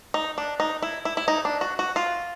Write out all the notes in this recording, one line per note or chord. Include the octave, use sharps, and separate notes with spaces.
D#4
D4
D#4
E4
E4
E4
D#4
D4
F#4
F#4
F4